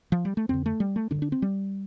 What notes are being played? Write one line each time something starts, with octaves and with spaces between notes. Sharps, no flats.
F3
G3
A3
F2 D3 C4
A3
G3
A3
G2 D3 D4
D4
C4
G3